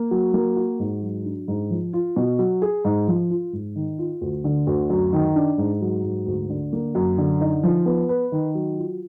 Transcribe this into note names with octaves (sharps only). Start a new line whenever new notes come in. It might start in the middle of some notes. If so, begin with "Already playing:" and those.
Already playing: A#3
F#3
A#3
F#4
G#2
F#3
D4
G#2
F3
F4
B2
F#3
G#4
G#2
F3
F4
G#2
D#3
F4
D2
D3
D2
F#2
D#3
D4
G#2
F#3
G#2
D2
D3
A#3
F#2
D3
D#4
F3
B3
B4
D#3
F#3
F4